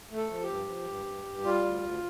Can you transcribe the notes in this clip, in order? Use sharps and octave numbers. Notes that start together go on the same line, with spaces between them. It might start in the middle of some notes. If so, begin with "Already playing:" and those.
A3
A4
F3
G4
G2
F3
G2
G2
G2
G3 F4
D2
D2